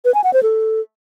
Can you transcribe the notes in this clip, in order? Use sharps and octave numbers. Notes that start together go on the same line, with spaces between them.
B4
G#5
F#5
C5
A4